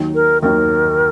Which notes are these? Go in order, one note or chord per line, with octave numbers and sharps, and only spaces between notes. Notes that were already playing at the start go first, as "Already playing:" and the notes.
Already playing: D#2 D#3 F#3
A#4
D#2 D#3 F#3 A#4